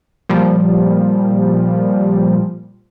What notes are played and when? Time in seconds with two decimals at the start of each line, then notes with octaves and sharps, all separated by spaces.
0.29 A#2 F3 G3